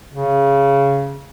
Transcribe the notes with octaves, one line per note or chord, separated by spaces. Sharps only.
C#3